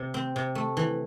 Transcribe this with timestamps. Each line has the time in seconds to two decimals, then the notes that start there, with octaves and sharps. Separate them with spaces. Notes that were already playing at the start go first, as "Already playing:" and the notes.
Already playing: C3
0.14 C4
0.36 C3
0.55 A3
0.77 E3